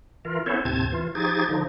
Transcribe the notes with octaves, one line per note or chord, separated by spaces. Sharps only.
E3 F4 A#4
B3 C#4 E4 A4 C5 C#5
D#2 A2 C3 C4 A5 G#6
E3 F4
F3 D#4 G4 G#4 G#6 A6
D3 F3 D#4